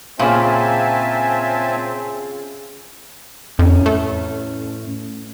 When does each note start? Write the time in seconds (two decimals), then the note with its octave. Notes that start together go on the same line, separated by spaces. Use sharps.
0.19 A#2 C#3 C4 F4 E5 G#5 A5
3.59 F2 A2 C#4
3.86 A3